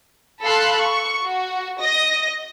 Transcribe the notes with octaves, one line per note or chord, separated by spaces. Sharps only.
A4 F5 A5 B5 C6 F#6
C#6
F#4
D#5 A#6